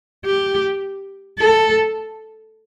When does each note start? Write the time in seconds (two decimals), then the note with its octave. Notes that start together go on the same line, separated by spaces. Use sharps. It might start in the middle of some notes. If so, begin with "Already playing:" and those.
0.25 G4
1.39 A4